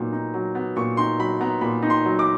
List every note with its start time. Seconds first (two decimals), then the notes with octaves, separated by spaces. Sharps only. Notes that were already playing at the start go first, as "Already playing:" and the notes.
Already playing: A#2 F#3 B3 D#4
0.13 D#4
0.34 F#3
0.55 B3
0.76 A#2 C#6
0.97 D#4 C6
1.19 F#3 B5
1.41 B3 A#5
1.61 A#2 B5
1.82 D#4
1.90 C6
2.05 F#3
2.19 D6